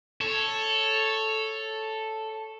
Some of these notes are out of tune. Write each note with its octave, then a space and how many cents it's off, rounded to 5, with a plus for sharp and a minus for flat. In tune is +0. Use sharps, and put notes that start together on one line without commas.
A4 +0 C#5 +0